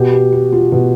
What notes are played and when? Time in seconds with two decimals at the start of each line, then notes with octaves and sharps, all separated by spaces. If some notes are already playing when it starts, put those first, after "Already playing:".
Already playing: B2 G4
0.13 G4
0.32 F#4
0.52 F4
0.72 B2